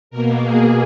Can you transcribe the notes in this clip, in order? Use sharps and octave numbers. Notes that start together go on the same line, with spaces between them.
B2 A#3 A#4
G#4